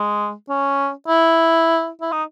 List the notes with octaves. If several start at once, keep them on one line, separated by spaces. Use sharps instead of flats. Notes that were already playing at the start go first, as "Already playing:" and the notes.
Already playing: G#3
C#4
E4
E4
D#4